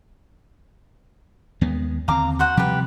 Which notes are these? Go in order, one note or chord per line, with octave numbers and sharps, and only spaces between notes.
D#2 G#3 B3
D#2 D3 C4 F5 A#5 D6
F#4 C5 F#5
C3 F3 G3 G4 B4